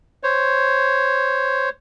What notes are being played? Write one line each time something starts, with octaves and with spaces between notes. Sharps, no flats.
C5 C#5